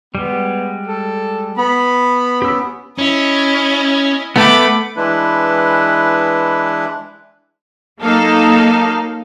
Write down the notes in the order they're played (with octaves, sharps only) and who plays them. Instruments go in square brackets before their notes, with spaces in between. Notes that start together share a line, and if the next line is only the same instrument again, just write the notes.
[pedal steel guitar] G3 G#3 [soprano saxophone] B3
[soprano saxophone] A4
[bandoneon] B3 [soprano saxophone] B5
[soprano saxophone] C#4 [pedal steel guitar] G4 E6
[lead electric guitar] C#4 [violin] E4 D#5
[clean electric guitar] A3 B3 [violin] B5 D6
[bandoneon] E3 G#3 D4 E4 B4
[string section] F#3 A#3 D#4 A4 F5